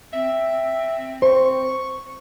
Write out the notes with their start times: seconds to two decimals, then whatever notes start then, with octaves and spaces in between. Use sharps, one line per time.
0.13 C4 E5
1.22 C5 C#6